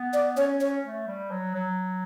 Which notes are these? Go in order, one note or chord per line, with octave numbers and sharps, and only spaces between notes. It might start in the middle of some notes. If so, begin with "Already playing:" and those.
Already playing: B3
D5
C#4 C#5
C#5
A3
G3
F#3
F#3